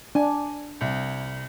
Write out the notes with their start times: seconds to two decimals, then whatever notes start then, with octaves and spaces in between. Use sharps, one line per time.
0.15 D4 G#5
0.81 C2